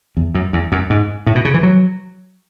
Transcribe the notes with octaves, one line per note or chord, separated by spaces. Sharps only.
E2
F#2
E2
F#2
G#2
A2
B2
C#3
E3
F#3